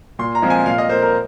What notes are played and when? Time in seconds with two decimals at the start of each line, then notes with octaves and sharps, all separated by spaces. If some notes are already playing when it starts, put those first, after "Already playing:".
0.19 A#2 C6
0.35 A#5
0.42 F3 G#3 C4
0.50 G#5
0.66 A#2 F5
0.78 D#5
0.89 A#3 C5
1.02 A#4